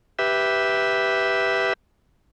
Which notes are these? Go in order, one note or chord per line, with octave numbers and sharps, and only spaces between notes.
G4 B4 E5